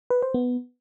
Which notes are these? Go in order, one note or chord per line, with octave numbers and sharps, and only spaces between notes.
B4
C5
B3